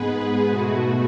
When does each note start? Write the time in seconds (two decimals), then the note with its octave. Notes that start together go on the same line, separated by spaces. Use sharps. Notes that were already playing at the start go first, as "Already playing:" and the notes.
Already playing: G#2 G#3 B3 G#4 B4
0.48 B2 A3 F#4